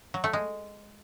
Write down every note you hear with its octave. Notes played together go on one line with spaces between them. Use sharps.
F#3
A3
G#3